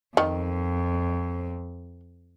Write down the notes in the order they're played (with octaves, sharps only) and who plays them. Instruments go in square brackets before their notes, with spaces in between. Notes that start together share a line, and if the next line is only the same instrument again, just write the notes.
[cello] F2 [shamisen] D#3